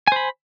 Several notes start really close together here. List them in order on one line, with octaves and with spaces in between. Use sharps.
G#5 C5 B5